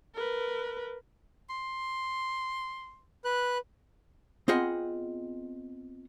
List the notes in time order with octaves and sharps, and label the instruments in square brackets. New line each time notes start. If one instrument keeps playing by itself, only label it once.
[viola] A#4 B4
[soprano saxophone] C6
[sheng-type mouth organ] B4 F#6
[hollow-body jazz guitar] B3 C4 F4 G#4 D#5 F#5